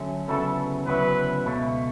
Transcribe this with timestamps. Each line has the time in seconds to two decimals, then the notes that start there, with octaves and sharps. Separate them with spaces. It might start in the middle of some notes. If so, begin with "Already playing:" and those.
Already playing: D3 F#3 A3 C#4
0.28 D2 C#3 F#3 B3 E4 A4
0.86 D2 C#3 F#3 B3 E4 B4
1.44 C#2 B2 A3